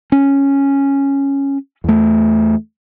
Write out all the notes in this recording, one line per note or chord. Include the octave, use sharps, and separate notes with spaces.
C#4
E2 A3